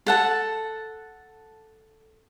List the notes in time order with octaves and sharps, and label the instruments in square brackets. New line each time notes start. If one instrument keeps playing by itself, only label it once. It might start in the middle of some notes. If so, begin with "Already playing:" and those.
[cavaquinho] A4 F#5 A5